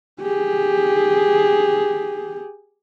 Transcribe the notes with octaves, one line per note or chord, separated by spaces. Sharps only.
G4 G#4